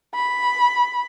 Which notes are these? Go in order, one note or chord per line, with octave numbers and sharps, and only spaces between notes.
B5